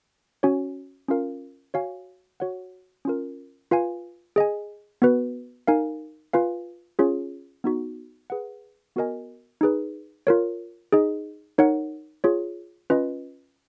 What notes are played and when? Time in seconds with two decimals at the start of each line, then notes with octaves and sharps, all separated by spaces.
0.43 C#4 F#4 C#5 G#5
1.08 C#4 F4 A#4 F5
1.74 F#4 C#5 F5 G#5
2.40 F#4 C#5 F#5
3.05 C#4 F4 A#4
3.71 F4 B4 F5 G#5
4.36 G#4 D#5 G#5
5.02 B3 F#4 B4
5.67 D#4 A#4 F5 G#5
6.33 F4 B4 F5 G#5
6.99 C#4 F4 G#4 C#5
7.64 B3 D#4 F#4
8.30 G#4 B4 F#5
8.96 B3 F#4 A#4 D#5 G#5
9.61 D#4 G#4 B4
10.27 F4 A#4 C#5
10.92 D#4 G#4 D#5
11.58 D#4 A#4 C#5 F#5
12.24 F4 G#4 C#5
12.90 C#4 F4 B4 D#5